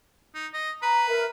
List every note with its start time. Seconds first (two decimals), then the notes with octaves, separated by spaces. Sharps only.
0.35 D#4
0.54 D#5
0.82 B4 A#5
1.08 A#4 E5